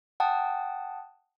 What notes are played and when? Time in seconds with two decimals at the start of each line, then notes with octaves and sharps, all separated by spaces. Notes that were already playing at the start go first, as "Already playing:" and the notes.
0.20 F#5 G5 A5 D#6